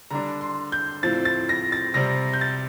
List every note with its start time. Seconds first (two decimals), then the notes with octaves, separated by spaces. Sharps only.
0.11 D3 G3 D4 A#5
0.41 C6
0.72 G6
1.03 A2 F3 C4 A6
1.25 A6
1.49 A#6
1.72 A6
1.94 C3 G3 C4 A#6
2.33 G6
2.41 A6